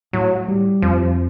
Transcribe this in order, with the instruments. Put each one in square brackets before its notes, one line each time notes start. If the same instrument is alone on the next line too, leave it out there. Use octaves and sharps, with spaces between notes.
[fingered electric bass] A2 [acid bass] F#3
[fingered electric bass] G3
[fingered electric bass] F2 [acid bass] F3